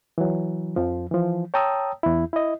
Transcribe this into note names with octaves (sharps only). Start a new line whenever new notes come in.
E3 F#3
F2 F3
E3 F3
C#5 G5 A5 A#5 D#6 E6
E2 E4
E4 D#5